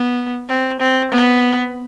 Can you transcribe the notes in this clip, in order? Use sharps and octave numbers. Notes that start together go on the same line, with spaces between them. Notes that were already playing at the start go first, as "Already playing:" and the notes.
Already playing: B3
C4
C4
B3